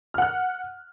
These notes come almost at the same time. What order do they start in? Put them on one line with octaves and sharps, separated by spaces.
F6 F#5 F#6